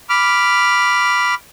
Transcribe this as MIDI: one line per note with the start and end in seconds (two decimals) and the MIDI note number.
0.10 1.35 83
0.10 1.35 86
0.10 1.35 89